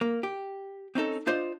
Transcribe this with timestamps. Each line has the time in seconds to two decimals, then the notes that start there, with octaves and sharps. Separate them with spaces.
0.01 A#3
0.23 G4
0.95 C4 C#4 D#4 A4
1.27 D4 F4 C5 D5 D#5